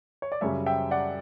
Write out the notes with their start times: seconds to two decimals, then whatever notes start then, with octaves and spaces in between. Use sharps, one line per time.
0.22 C#5
0.32 D5
0.41 F#2 C#3 G3 C#5 E5
0.66 E5 G5
0.91 D5 F#5